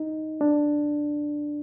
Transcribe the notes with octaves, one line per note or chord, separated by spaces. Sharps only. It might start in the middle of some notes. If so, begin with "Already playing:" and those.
Already playing: D#4
D4